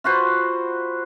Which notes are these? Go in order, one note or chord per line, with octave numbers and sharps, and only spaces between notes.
F4 F#4 B4 C5